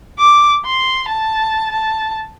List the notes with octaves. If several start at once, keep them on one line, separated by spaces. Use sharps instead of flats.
D6
C6
A5
A5